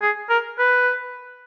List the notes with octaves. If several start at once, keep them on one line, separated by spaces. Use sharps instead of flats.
G#4
A#4
B4